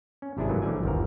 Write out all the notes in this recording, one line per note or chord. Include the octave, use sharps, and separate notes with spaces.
C#4
G#1 C3 D4 E4 G#4
G#2 D#3 E3 F#3 A3 A#3
A#1 D3 E3 G3 D5 G#5
G1 D#2 F3 A#4